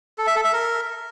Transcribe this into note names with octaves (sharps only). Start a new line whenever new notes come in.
A4
E5
A4
E5
A#4